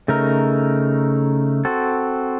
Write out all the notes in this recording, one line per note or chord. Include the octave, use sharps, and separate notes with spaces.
C#3 A3 D#4 A#4
C4 F#4 A4